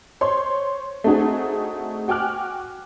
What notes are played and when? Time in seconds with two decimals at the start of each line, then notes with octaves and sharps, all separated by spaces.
0.21 C5 C#5 C6
1.04 A3 C4 D4 D#4 F#4 G#4
2.08 F#4 G5 G#5 D6 F6 F#6